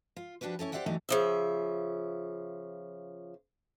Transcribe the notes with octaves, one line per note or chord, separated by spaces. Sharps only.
F4
F3 D4 F#4 G4 B4
A3 C#4 E4 C#5
G4 C5 D5 E5 F#5 G5
D3 E3 F#3 A3 D#4 G4
C#3 F3 E5